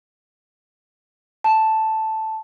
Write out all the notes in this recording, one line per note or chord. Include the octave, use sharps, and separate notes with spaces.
A5